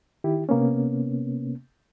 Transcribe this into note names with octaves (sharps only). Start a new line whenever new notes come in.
D#3 E4 G4
C3 A#3 B3 C#4